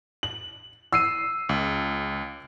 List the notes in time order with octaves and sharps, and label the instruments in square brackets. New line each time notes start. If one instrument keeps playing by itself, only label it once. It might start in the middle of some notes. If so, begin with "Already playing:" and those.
[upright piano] F#7
E6 C7 D#7
[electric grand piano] C#2